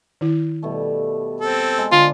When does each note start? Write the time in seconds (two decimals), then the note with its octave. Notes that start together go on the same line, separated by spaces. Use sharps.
0.21 D#3 E4
0.63 B2 G3 A3
1.41 C4 A4
1.78 G#3
1.92 D3 D4 F4 C5 B5